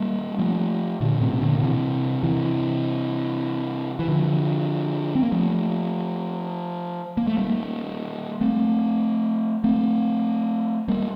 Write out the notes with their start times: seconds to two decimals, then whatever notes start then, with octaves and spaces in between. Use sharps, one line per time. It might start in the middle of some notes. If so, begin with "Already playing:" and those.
Already playing: G3 A#3
0.39 F3 A3
1.01 A#2 D3
1.20 A2 C3
1.33 C3
1.41 A#2 D3
1.57 D3
1.62 C3 E3
2.23 C3 E3
3.99 E3
4.08 D3 F3
5.15 C4
5.23 A#3
5.32 F3 A3
7.17 A#3
7.27 A3
7.37 G3 A#3
8.41 A3 C4
9.64 A3 C4
10.88 G3 A#3